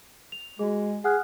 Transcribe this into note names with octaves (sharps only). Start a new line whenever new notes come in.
F7
G#3 F#4 G#4
G#4 F#5 F6 F#6